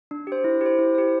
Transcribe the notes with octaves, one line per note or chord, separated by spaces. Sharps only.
D4
G4 C5
E4
G4 C5
E4
G4 C5